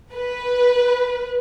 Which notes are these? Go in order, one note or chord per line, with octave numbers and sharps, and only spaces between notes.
B4